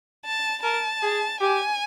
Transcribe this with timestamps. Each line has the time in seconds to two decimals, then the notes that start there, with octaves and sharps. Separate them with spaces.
0.25 A5
0.63 A#4 A5
1.02 G#4
1.41 G4 G#5